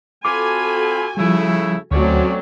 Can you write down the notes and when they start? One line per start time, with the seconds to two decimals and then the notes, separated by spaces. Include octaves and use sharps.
0.25 C4 F4 F#4 A4 G#5 B5 D6
1.17 C#3 F3 G3 A3 E4
1.91 D2 F#3 A3 C4 C#4 C#5 D5